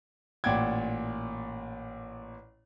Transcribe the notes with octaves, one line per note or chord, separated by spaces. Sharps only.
A1 A#2 D5 F#5 G5 G#6